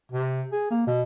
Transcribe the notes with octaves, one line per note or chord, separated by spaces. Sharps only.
C3
G#4
A#3
B2